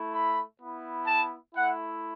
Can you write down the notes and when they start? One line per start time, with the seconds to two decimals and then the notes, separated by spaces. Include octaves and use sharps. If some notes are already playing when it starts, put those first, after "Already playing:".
Already playing: A3 E4
0.13 B5
0.60 B3 E4
1.07 A5
1.54 A3 E4 F#5